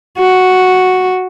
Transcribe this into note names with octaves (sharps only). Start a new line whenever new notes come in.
F#4